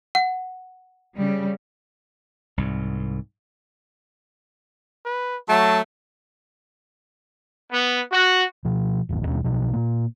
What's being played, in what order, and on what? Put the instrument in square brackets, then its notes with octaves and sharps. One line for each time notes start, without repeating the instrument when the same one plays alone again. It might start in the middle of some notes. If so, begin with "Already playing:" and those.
[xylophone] F#5
[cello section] C#3 G3
[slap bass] C2 G#2
[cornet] B4
[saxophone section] F#3 A3 [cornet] A5
[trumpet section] B3
F#4
[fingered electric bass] B2 F3
E1 A1 D#2 E3
D#2 B2 G3 C#4
B1 B2 F3
A#2 A#3